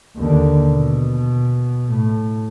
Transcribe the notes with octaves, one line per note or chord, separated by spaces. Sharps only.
D#2 D3
B2
A2